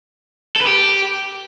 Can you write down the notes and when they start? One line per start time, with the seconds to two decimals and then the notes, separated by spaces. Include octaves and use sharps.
0.56 A4
0.61 B4
0.66 G4